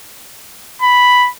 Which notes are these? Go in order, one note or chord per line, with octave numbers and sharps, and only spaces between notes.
B5